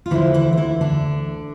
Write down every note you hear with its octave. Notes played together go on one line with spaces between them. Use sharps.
F4
D2 D3 E3 F3 E4
E3 E4
F4
E3 E4
D3 D4